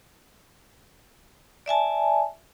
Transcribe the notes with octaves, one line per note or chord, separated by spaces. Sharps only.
D5 E5 G#5 A5